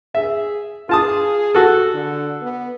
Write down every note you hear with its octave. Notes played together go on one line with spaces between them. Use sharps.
G#4 E5
F4 G#4 A5 D#6
F#4 A4
D3
B3